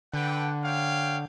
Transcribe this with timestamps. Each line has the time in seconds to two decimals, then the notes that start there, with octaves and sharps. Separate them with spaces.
0.14 D3 B4 F#5 G5
0.64 C#5 F5 G5